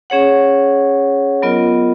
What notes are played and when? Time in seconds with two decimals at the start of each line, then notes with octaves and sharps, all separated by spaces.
0.10 C#4 G#4 C#5 F#5
1.42 F#3 B3 F4 A#4 D#5